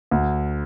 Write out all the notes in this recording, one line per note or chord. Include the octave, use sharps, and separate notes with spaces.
D2